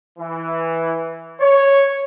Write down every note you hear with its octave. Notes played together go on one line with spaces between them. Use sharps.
E3
C#5